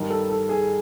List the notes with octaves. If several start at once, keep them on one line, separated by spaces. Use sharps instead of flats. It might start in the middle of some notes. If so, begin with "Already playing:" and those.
Already playing: G2 D#3 G3
A4
A4
G#4